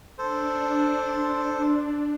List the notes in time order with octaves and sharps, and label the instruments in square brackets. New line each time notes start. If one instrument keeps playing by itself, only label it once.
[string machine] D4 [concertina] A4 C5